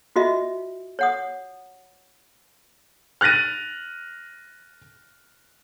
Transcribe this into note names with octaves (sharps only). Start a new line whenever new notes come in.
F4 F#4 D#5 E5
C#5 F#5 D#6
F6 F#6 A6 A#6 D#7